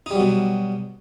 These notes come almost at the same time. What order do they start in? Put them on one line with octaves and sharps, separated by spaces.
D#4 G3 F#3 B2